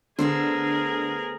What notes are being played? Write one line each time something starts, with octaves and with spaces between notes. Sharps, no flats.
D2 D3 B3 G#4 A#4 C5